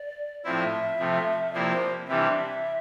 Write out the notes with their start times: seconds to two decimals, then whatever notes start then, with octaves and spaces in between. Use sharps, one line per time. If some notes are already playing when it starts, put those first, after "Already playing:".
Already playing: D5
0.44 A2 F3 C4 E4 E5
0.99 C3 F3 A3
1.53 C3 F3 A#3 E4 D5
1.71 C5
2.08 C3 E3 G3 D4 E5